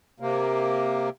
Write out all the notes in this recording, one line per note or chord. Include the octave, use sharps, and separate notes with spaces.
C3 A#3